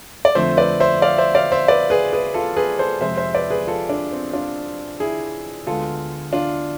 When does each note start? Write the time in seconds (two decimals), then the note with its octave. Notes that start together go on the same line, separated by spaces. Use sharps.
0.25 D5
0.35 F2 D3 F3 A3 C4 C5 E5
0.57 B4 D5
0.80 C5 E5
1.02 D5 F5
1.18 C5 E5
1.35 D5 F5
1.52 C5 E5
1.68 B4 D5
1.90 G#4 B4
2.13 G#4 B4
2.34 F4 A4
2.56 G#4 B4
2.79 A4 C5
3.01 F2 C3 G#3 C4 C5 E5
3.17 C5 E5
3.35 B4 D5
3.50 G#4 B4
3.67 F4 A4
3.89 D4
4.13 C4
4.33 D4 F4
5.00 E4 G#4
5.67 D2 D3 G#3 B3 F4 A4
6.33 D4 F4